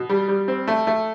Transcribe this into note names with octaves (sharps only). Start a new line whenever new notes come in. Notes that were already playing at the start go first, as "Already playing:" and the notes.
Already playing: B2
G3
G3
C4
A3
A3